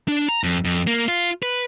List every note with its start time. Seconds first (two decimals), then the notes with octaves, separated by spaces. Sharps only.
0.08 D4
0.29 A#5
0.44 F2
0.65 F2
0.87 A#3
1.08 F4
1.43 B4